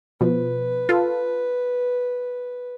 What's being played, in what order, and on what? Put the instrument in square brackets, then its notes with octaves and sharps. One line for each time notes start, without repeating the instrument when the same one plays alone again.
[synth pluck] B2 F3 [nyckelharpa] B4
[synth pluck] F4 A4